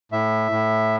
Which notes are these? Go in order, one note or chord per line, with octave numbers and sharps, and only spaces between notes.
A2 E5
A2